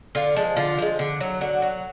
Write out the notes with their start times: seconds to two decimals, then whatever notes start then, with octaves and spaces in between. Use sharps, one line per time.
0.15 D3 F4
0.36 F3 G#3
0.57 D3 F4
0.78 F3 G#3
0.99 D3
1.20 F#3
1.41 D3 F#4
1.62 F#3